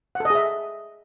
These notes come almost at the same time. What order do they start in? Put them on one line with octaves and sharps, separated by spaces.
F#5 A4 D#5 G#4 E5